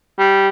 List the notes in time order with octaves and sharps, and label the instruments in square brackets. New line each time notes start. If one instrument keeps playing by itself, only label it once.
[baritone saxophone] G3